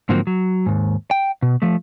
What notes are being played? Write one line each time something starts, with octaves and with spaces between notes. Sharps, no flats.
G#2 D3 F3 F#3 A#3 C4
F#3
D#2 G#2
G5
B2
F3 A3